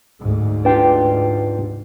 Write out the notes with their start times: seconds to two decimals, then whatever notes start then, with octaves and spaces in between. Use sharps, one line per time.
0.21 D2 G#2
0.65 D4 F4 G4 B4 G5